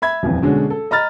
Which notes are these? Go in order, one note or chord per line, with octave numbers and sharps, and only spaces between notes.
E5 B5 G#6
D#1 F2 E3
B2 D3 G#3 C#4 F#4
A4
D#5 A#5 B5 F6 A6